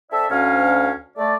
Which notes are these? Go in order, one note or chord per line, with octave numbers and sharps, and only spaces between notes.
C4 A4 D5 E5
D2 C#4 F5
A3 D5